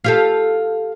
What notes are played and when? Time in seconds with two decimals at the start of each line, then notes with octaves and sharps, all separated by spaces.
0.04 F4 G4 A4